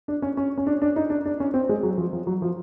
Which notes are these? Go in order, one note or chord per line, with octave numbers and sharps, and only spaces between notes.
D4
C#4
C#4
C#4
D4
D4
D#4
D4
D4
C#4
C4
G#3
F#3
F3
F3
F#3
F3